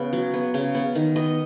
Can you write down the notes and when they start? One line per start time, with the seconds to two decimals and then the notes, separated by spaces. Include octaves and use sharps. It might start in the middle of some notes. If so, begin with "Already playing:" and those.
Already playing: C#3 B3 B4
0.13 F#3
0.34 B3
0.54 C#3
0.75 B3
0.95 D#3
1.16 B3 D#5